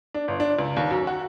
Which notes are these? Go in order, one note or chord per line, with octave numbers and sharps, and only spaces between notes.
D4
G1
D4
C#2
D#2
F#2
F#4